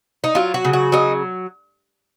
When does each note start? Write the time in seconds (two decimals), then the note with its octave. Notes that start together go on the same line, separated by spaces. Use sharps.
0.24 D#4
0.35 F#3 F4
0.54 F#4
0.65 C#3
0.73 F#4
0.92 F#3 D#4